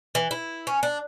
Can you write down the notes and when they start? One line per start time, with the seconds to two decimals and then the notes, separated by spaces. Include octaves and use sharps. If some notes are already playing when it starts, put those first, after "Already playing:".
0.15 E3
0.31 E4
0.67 C#4
0.83 D4